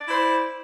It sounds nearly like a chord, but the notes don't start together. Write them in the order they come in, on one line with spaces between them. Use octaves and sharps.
D5 E4 C5